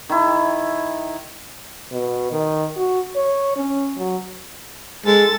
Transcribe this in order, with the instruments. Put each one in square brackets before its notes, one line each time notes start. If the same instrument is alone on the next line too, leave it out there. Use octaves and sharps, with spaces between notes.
[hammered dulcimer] D#3 E4
[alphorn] B2
D#3
F#4
C#5
C#4
F#3
[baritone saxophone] G#3 [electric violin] A4 A6